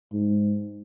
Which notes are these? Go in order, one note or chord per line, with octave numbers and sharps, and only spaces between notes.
G#2